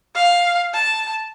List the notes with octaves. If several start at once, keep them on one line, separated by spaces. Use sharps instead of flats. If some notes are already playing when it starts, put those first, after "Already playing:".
F5
A5